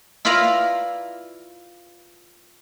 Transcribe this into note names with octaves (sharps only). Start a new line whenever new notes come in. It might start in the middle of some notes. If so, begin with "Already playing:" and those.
E4 F4 B4 D5 F5 A#5